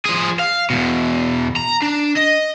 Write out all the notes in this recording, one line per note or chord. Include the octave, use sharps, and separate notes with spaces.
F3 G#4
F5
E2 B2
A#5
D4
D#5